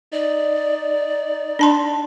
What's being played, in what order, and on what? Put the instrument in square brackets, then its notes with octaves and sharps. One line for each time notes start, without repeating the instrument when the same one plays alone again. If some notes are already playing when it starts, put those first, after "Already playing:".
[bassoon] D#4 [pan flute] D5
[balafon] D4 A5 C6